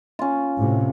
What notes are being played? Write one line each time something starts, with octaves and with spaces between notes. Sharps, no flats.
C#4 F4
A2 C3